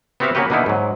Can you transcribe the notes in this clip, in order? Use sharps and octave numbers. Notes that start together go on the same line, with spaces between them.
B3 C4 F#4 G4 E5 F5
A#3 B3 C#4 F#4 G4 B4
B2 D3 A#3 B3 D#4 E4
G#2 F#3